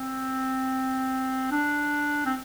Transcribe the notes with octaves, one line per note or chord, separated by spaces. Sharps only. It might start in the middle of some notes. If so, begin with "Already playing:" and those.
Already playing: C4
D4
C4